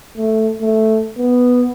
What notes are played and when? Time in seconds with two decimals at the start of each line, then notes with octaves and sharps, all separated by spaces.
0.17 A3
0.62 A3
1.18 B3